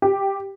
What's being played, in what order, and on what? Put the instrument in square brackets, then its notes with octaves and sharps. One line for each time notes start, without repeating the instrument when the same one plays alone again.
[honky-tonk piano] G4